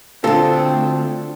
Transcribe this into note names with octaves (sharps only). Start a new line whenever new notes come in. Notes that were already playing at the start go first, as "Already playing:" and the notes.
D3 A3 C4 D4 F4 A4